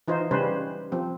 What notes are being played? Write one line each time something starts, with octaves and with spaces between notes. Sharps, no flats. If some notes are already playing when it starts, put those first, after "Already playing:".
E3 D#4 F4 C5
C#3 G3 C#4 B4 C5
F3 C4